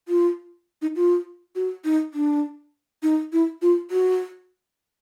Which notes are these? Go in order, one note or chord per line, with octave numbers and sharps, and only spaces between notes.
F4
D#4
F4
F#4
D#4
D4
D#4
E4
F4
F#4